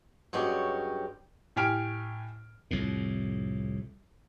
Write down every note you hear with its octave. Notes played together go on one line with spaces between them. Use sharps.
G2 F#3 G#3 C#4 G4
A2 G4 G#5 F6 D7
C2 F2 A2